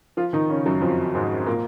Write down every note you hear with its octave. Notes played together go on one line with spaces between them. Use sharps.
F3 F4
D#3 D#4
C#3 C#4
F#2 F#3
F2 F3
G#2 G#3
A#2 A#3